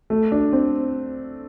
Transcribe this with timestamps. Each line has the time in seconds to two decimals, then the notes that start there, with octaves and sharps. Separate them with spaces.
0.10 A3
0.32 D4
0.53 C4